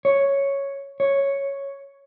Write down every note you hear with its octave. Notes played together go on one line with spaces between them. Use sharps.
C#5
C#5